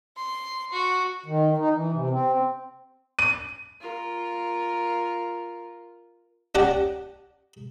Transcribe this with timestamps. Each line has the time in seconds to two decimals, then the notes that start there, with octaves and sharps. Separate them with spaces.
0.17 C6
0.72 F#4
1.26 D#3
1.57 D#4
1.74 E3
1.92 C3
2.10 C4
3.19 D#7
3.81 F4 A#4
6.55 C#4 G4 D5 F#5 A5